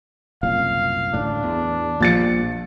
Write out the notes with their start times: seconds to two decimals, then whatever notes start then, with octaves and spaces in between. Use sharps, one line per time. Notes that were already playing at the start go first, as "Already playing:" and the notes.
0.43 F#1 C2 A#2 F5
1.14 A1 D2 A2 D4
1.43 E2
2.00 A#1 A#2 F3 G3 A6 C#7